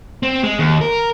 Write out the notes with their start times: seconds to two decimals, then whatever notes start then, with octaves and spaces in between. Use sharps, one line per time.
0.23 C4
0.43 G#3
0.59 D#2
0.81 A#4